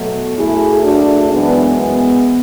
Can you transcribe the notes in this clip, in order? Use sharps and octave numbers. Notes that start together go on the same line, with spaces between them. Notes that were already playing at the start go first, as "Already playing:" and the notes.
Already playing: B2 F#3 A3
F#2 C#3 F#3 A3 E4 G#4
D4 F#4
F#2 E3 G#3 B3 D4
B3